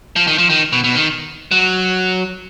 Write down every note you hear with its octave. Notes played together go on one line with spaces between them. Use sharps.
F3
D#3
F3
D#3
B2
B2
D#3
F#3